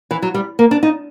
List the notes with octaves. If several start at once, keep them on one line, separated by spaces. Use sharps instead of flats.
E3
F#3
G3
A#3
D4
D#4